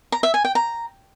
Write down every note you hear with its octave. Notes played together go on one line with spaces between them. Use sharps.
A#5
E5
G#5
G5
A#5